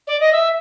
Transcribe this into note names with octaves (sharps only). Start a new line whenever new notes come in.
D5
D#5
E5